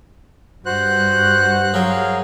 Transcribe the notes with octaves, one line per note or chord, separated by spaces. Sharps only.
G2 F#4 C5 F#6
F#3 G#4 A#4 F5